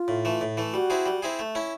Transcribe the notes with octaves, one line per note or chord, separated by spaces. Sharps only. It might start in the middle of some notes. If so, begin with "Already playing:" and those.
Already playing: F4
A2
E3 A3
A2
E3 A3
G3 F#4
C4 E4 G#4
G3
C4 E4 G#4
A3
C#4 E4